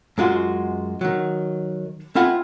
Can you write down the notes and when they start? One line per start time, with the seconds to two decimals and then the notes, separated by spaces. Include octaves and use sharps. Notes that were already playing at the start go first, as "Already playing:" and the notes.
0.18 F#2 G#3 F4 F#4
1.01 D#3 F#3
2.15 C4 E4 F4 F#5 G#5